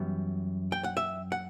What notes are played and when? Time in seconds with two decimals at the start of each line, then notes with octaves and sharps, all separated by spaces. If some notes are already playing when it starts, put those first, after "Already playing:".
Already playing: F#2 E3 G3 B3
0.72 G5
0.84 F#5
0.97 E5
1.32 F#5